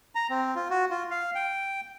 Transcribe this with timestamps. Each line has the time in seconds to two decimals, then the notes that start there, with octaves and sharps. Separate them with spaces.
0.15 A#5
0.30 C4
0.55 F4
0.70 F#4
0.90 F4
1.11 F5
1.35 G5